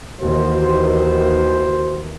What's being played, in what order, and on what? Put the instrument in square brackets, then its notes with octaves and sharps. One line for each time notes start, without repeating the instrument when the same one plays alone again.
[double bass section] D#2 D#3 E3 [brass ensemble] F#4 C5